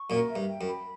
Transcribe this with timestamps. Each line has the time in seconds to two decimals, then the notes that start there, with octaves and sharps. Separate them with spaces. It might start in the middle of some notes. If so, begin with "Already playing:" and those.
Already playing: C#6
0.10 F#2 A#2 A#4
0.29 E5
0.36 G2
0.48 G5
0.61 F#2
0.67 B5